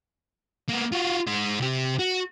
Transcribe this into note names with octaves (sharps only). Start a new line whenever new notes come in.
A#3 B3
F4 F#4
G#3 C5
C3 G4
F#4